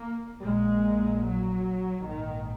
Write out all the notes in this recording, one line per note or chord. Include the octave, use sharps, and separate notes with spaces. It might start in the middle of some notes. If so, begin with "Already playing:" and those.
Already playing: A#3
A#1 A#2 G#3
F#3
A#1 G#2 D#3